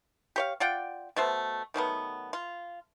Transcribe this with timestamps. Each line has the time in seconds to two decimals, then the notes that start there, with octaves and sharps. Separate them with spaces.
0.36 G4 C#5 F5
0.60 F4 D5 F#5 G5
1.16 B2 A3 C5
1.74 D#3 F#3 A3 B3
2.33 F4